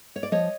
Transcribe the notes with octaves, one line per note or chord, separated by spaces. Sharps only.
C#5
D5
F3 C#5 D#5